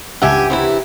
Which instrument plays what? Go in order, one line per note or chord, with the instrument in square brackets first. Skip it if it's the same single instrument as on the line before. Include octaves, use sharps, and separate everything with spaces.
[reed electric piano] C#2 E5 F#5 [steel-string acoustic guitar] G2 G4 G#5
[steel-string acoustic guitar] C3 E3 E4